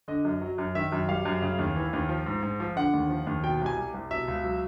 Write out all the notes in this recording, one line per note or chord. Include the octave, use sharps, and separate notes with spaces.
D3 D#5
F#2
F#3
F#2
D#3 E5
F#2
G3 F5
F#2
C#3
D#2
E3
D#2
F3
G#2
G#2
F3
D3 F#5
D#2
F3
D#2
B2 G5
C2
G#5
G3
C2
B2 E5
C#2
F#3